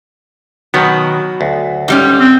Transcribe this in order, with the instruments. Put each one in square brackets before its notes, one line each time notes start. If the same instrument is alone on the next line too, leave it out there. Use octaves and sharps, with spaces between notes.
[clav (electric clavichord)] B2 D#3 B3 [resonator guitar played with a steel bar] F#3
[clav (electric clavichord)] D2
[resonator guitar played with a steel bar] G#2 G3 C#4
[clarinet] C4